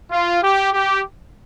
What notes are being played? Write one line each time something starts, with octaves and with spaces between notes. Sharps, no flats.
F4
G4
G4